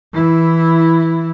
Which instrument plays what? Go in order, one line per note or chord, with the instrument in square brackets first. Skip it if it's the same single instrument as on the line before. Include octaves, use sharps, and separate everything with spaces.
[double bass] E3 E4